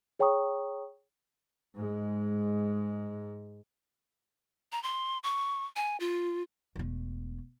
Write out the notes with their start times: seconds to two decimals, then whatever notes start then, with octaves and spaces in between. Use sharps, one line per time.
0.19 G#4 C#5 G5 A#5 C#6 D#6
1.75 G#2 G#3
4.72 A#5
4.83 C6
5.24 C#6
5.76 G#5
6.00 F4
6.76 E1 A3